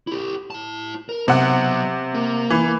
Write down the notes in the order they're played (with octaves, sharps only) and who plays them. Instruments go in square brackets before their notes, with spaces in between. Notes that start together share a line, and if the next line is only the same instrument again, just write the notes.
[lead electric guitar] E4 G4
E4 A5
A#4
[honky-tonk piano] C3 F#5 [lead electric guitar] F#3 B3
[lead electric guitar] A#3
[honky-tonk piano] E3